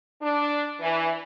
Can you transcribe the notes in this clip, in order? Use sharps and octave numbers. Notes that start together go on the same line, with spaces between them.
D4
E3